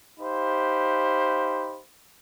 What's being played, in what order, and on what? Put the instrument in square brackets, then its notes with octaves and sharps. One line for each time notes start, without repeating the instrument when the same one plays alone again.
[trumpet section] D#4 G4 C5 F5 B5